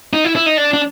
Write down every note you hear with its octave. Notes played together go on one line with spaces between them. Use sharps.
D#4
E4
E4
D#4
D4
D4